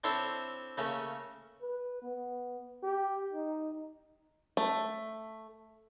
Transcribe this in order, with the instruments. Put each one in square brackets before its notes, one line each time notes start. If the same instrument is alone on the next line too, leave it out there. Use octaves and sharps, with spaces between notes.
[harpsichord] C4 D4 E4 A4 C5 C#5
C#3 A3 A#3 C#4
[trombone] B4
B3
G4
D#4
[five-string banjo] A3